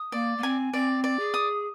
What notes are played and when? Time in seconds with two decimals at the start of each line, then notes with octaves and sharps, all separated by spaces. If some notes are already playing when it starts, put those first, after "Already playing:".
Already playing: D#6
0.12 A#3 D5
0.38 A#3
0.43 C4 G#5
0.73 C4 D5
1.04 D5
1.19 G#4
1.34 D#6